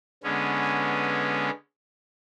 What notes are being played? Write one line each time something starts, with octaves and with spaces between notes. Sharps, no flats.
D3 G#3 B3 C#4